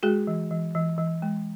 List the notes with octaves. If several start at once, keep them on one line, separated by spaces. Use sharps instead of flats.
G#3 F#4 G#4
E3
E3
E3
E3
G#3